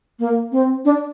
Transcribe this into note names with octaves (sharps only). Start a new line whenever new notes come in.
A#3
C4
D4